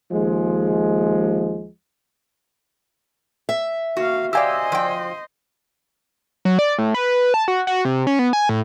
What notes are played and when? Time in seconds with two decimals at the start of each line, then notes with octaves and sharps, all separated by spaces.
0.11 D#2 F3 G#3
3.49 E5
3.97 A#3 F#4 F5
4.33 G4 C5 D5 D#5 F5 G5 G#5 E6
4.72 F3 G5
6.45 F#3
6.59 D5
6.78 A2
6.94 B4
7.34 A5
7.48 F#4
7.67 F#4
7.85 C3
8.07 C#4
8.19 B3
8.33 G#5
8.49 A2